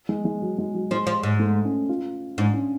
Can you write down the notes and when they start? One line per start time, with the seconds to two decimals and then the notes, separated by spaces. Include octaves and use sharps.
0.09 G#3
0.25 G#3
0.42 F#3
0.58 G#3
0.75 F#3
0.91 F3 G#3
1.07 F3
1.23 G#2
1.39 A3
1.65 C#4
1.89 F4
2.38 G#2 D4
2.54 C#4